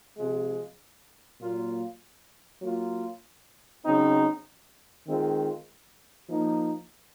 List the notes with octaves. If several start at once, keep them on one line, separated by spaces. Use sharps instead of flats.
C3 F3 G#3
A#2 F#3 A#3 F4
F#3 A#3 F4
C#3 F#3 C4 D#4
D#3 G#3 C4 F4
F3 A#3 D#4